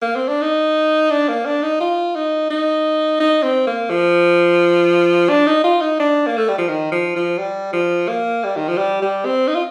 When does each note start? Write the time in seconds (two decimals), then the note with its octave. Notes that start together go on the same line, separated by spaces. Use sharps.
0.02 A#3
0.16 C4
0.28 D4
0.42 D#4
1.11 D4
1.29 A#3
1.46 D4
1.63 D#4
1.81 F4
2.15 D#4
2.51 D#4
3.20 D#4
3.43 C4
3.67 A#3
3.90 F3
5.29 D4
5.47 D#4
5.64 F4
5.82 D#4
6.00 D4
6.27 A#3
6.38 A3
6.49 G3
6.58 F3
6.69 D#3
6.92 F3
7.16 F3
7.39 G3
7.73 F3
8.08 A#3
8.44 G3
8.57 D#3
8.68 F3
8.78 G3
9.02 G3
9.25 C4
9.48 D#4
9.55 F4